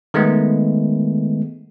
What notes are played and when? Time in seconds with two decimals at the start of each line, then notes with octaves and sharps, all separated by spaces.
0.14 D#3 G#3 A3 B3